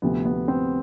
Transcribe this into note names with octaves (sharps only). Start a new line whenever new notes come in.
D2 C3 F3 B3
B3
C4